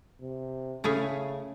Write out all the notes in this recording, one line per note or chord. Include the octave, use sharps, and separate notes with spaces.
C3
C#3 A3 C#4 E4 G#4 C#5